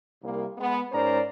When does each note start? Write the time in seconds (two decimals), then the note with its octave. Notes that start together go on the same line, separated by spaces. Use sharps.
0.23 C2 A#3
0.58 G#3 B3
0.92 G#2 C#4 A#4 C5 D5 A#5